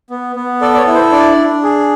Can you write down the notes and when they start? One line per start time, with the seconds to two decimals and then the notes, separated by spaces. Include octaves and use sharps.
0.10 B3
0.36 B3
0.61 A4 D5
0.74 D5
0.78 C#5
0.87 E4
0.95 C5
1.12 D4 D5
1.38 D4
1.63 G#4